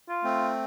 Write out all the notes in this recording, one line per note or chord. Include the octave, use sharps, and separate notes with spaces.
F4
A3 C4